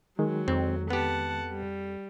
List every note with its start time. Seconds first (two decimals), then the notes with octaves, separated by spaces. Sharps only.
0.19 D#3 F#3 G#3
0.48 F2 C4
0.90 B3 G4 F#5 A5
1.50 G3